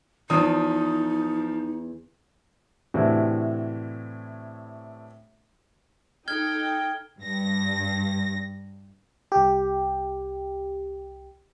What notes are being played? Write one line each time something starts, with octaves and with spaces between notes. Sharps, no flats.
E2 F3 D#4 D#6
A2 C3 E3 D4 E4 F#4
D#4 A4 G5 F6 G#6 G7
G2 A#6
C2 G4